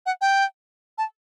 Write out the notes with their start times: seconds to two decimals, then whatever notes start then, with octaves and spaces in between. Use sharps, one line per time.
0.06 F#5
0.21 G5
0.98 A5